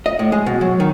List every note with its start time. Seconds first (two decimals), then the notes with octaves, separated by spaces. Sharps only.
0.06 D#5
0.19 A2
0.32 G#3
0.46 B2
0.61 F#3
0.80 D#3